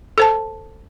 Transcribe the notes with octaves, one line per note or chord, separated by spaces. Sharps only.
A4 C5 A5